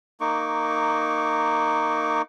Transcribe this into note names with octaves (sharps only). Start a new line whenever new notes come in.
A#3 D#4 C#6 D6